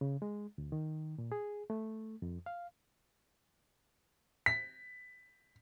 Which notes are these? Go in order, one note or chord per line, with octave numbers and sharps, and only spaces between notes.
C#3
G#3
D2
D#3
A#2
G#4
A3
F2
F5
B6